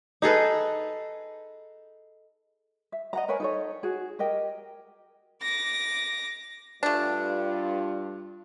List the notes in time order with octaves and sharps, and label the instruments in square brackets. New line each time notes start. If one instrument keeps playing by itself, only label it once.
[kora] D#4 G#4 A4 B4
[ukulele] E5
D#5 F#5 A#5
A#4 B4 C#5 G#5
D#4 A4 C#5
F#4 G#4
G4 A#4 D#5 G5
[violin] D6 A#6
[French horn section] G2 F4 [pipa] A3 D4